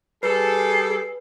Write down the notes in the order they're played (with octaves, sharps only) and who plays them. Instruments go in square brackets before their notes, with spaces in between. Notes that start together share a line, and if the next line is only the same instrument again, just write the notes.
[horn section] G3 G#4 A4 [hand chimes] B4 [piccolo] C7